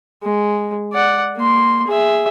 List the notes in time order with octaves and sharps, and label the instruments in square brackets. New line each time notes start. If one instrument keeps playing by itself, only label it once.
[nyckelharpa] G#3
D5 F#5
A#3 C6
G#4 E5